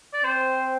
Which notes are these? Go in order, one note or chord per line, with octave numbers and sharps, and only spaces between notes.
D5
C4 C5